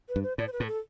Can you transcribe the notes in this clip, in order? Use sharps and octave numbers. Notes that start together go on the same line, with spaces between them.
B4
G2
C5
A2 D5
C5
B4
A2
A4